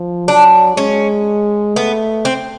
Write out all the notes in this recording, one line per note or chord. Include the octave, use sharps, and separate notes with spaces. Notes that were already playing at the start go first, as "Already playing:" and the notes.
Already playing: F3
F#3 D4
G#3 C#4
A3 B3
C4